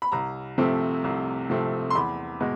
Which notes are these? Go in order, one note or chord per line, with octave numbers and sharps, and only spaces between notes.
B5
C2 A#5
C3 F3 A3 C4
C2
C3 F3 A3 C4
C6
E2 B5
B2 G#3